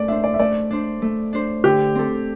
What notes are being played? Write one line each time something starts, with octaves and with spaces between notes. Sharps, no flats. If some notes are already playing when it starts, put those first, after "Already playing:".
Already playing: A3 D5
D4 C5 E5
D5
E5
A3 D5
D4 C5
A3
D4 C5
D3 G4
C4 A4